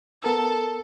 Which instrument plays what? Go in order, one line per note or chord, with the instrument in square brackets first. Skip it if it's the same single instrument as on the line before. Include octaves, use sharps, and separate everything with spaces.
[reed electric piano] B3 A#4 E6 [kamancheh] A4